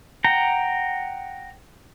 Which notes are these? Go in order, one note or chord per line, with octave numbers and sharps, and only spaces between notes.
F#5 G5 A#5